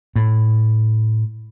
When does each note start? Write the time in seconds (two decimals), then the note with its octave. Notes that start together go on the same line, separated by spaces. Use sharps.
0.16 A2